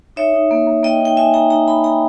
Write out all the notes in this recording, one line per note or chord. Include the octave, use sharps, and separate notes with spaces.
D#4 C#5 E5
D#4
A#3
A#3
A#3 D#5 G5
D#4
G5
D#4 E5 G#5
D#4 G5 A#5
D#4 G5 A#5
D#4 G#5 B5
D#4 G5 A#5